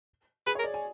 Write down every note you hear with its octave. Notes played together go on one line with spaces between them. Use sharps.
G#4 B4
C#5
A#4
D5
G#5